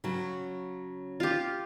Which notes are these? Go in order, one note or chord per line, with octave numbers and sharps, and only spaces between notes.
C#3 F#3
F4 G4